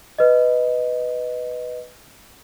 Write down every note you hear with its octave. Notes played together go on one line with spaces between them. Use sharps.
B4 D#5